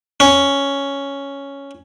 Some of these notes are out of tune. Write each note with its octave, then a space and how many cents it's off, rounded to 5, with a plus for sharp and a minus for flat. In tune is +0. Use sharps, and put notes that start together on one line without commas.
C#4 +5